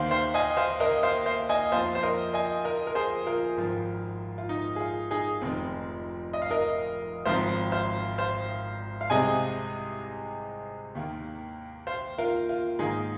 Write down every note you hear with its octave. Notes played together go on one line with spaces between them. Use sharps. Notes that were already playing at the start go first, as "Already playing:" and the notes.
Already playing: D#2 D#3 A#3 C5 F5
C5 F5
D#5 G#5
C5 F5
A#4 D#5
C5 F5
C5 F5
D#5 G#5
F2 F3 A#3 C5 F5
C5
A#4 D#5
D#5 G#5
A#4 D#5
A#4
G#4 C5
F4 A#4
G#1 G#2 F3
F4
D#4
G#4
F4
D#4 G#4
F1 F2 D#3 C4
D#5
F5
A#4 D#5
G#1 G#2 F3 C4 C5 F5
C5 F5
C5 F5
F5
C2 C3 G#3 C4 D#5 G#5
D#2 D#3 A#3
C5 F5
F4 A#4
F4
G#2 D#3 A#3 D#4 G#4